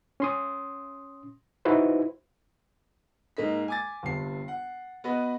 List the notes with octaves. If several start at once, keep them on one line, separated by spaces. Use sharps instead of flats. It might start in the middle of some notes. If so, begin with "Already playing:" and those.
C#4 C6 D#6
D#4 E4 F#4 B4 C5
G#2 A#3 D#5 B6
G#5 D6 A6
G1 G2 C3 C7
F#5
B3 F#4 B4 D#5